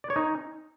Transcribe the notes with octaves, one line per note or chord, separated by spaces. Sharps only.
D5
C#5
D#4